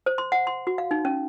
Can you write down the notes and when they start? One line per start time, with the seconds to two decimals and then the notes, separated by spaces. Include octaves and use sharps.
0.06 C5
0.18 C6
0.32 F#5
0.47 C6
0.67 F#4
0.78 F5
0.91 D#4
1.05 C#4